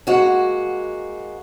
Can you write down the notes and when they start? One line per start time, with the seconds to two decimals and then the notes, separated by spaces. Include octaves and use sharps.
0.07 G#3 A#3 F#4